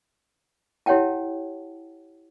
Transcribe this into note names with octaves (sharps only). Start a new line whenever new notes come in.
E4 G4 C#5 F#5 G5 A5